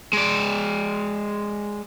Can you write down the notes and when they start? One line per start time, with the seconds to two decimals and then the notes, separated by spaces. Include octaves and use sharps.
0.13 G#3 D5